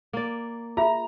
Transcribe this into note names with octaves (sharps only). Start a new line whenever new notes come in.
A#3 D5
F4 G#4 E5 A#5